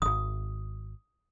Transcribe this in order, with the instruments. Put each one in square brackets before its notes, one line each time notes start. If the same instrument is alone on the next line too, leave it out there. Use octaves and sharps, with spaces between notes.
[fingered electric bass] D#1 G#1 [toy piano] D#6